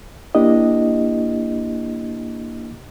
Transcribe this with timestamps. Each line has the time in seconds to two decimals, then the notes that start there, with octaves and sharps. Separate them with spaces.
0.35 A#3 D4 E4 G4 D#5